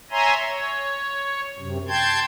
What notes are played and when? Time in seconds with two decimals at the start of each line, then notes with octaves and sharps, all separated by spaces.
0.11 C#5 E5 G#5 A#5 C6
0.48 C#5
1.59 F#2 C3
1.88 G5 A5 C6 G6 G#6